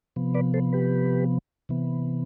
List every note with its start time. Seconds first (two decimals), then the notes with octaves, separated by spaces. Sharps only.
0.16 C3 F3 B3
0.35 B4 D5
0.54 A4 C5
0.73 G4 B4
1.69 C3 E3 B3